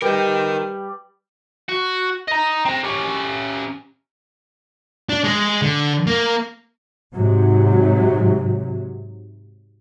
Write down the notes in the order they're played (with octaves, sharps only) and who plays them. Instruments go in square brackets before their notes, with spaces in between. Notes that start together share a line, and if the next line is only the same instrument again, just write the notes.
[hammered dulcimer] G3 [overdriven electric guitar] A#4 D#5 [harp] B4 G5
[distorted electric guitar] F#4
D#5 A#5
C4 A#5
C#4 G4
D4
G#3
D3
A#3
[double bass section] G#2 C3 F#3